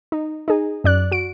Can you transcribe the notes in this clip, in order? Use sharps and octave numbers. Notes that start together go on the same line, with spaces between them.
D#4
D#4 G#4
F#2 D5 F#6
F#4 D7